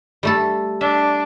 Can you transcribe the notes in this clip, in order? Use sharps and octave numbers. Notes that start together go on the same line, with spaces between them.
G3 A3 A4
D4 E5